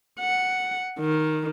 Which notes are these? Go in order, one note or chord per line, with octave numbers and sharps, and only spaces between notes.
F#5
D#3